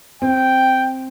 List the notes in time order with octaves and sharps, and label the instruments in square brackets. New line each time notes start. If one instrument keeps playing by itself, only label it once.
[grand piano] C4 [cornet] G5